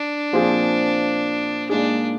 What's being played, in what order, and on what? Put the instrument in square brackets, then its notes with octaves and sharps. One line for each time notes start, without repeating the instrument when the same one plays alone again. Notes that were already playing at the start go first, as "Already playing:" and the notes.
Already playing: [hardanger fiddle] D4
[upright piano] A#2 F3 C4 F4 G#4
[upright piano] A#2 G#3 D#4 G#4 [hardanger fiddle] D4